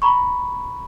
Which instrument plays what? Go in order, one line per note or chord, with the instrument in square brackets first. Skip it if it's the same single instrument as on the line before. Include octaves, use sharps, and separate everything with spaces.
[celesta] A#5 B5 C#6